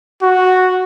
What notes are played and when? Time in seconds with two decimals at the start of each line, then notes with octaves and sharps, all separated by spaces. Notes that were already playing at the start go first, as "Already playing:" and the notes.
0.22 F#4